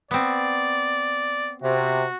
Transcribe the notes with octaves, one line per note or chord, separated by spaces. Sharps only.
B3 C4 D5
C3 F#4